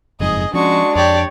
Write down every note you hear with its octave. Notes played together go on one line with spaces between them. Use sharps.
F#1 F2 G#2 G#4 D#5
F3 G#3 C#4 D4 F#4 C#6
F2 G4 C#5 D5